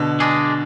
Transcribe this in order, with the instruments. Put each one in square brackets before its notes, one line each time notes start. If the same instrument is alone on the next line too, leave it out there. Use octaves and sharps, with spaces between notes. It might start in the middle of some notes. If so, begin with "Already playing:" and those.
Already playing: [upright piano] B2 D3
[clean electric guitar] G#3 D4 G#4